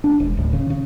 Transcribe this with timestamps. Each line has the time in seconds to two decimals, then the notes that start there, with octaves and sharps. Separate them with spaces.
0.04 D4
0.20 E1
0.37 D1
0.53 C#3
0.70 C#3